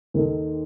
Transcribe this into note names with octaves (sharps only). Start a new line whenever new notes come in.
D#2 D#3 A#3 D#4 A4